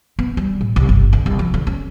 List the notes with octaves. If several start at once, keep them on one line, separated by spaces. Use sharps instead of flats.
B3
G3
A2
C2
G1
D3
C2
F3
D3
C#4